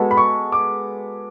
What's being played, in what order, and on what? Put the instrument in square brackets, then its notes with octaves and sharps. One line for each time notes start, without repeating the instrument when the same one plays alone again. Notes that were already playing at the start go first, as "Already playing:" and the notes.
Already playing: [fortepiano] G#3 B3 F#4 A4
[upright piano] B5
C#6
D6